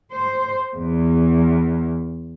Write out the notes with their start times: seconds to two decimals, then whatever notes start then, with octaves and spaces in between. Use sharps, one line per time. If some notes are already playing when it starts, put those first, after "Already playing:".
0.12 C5
0.77 E2